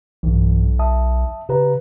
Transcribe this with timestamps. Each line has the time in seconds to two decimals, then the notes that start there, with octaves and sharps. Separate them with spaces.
0.23 B1 G2 E3
0.79 E5 A5 D#6
1.49 C#3 G4 B4 A#5